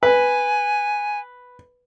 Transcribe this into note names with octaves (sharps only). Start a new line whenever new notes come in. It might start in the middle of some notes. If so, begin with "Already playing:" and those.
B4 G#5